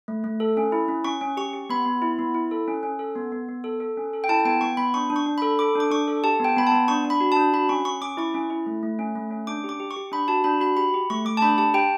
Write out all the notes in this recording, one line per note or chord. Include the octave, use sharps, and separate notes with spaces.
A3
A3
A4
C#4
E4
C#4
C#4 C#6
C#4
G4 C#6
G4
B3 B5
B3
E4
B3
E4
A4
C#4
C#4
A4
B3
B3
B3
A4
A4
C#4
A4
G5
E4 A5
B3 G5
B3 C#6
B3 B5
D4 C#6
D4
C#6
D4
B5
A4
A4 D6
D4 D6
D4 C#6
A4
G4 A5
B3 G5
B3 B5
A5
B3
D4 C#6
D4
B5
F#4
A5
D4
F#4 B5
C#4 C#6
C#4 C#6
C#4 D6
E4 C#6
C#4
E4
A3
A3
C#4
A3
C#4
D4 D6
G4
D6
G4
C#6
G4
D4 B5
F#4 A5
D4 B5
F#4 B5
G4 B5
G4
A3 C#6
A3 D6
A5
D4 B5
G4 A5
G4 G5